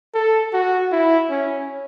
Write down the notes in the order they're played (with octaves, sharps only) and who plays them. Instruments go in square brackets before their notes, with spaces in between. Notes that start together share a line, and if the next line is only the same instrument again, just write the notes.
[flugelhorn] A4
F#4
E4
C#4